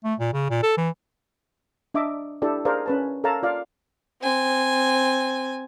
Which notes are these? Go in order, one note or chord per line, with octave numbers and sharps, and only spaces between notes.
A3
A#2
C#3
A#2
A4
E3
D4 D#5 E5 D6
D4 E4 G4 A4 D5
G#4 A#4 C5 D5 F5
C#4 B4 A5
A4 A#4 C#5 F5 A5 A#5
F4 D5 F5
C4 G#5